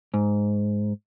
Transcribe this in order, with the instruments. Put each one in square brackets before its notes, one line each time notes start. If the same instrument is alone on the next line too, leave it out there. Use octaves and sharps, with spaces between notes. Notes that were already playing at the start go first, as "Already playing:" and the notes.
[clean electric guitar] G#2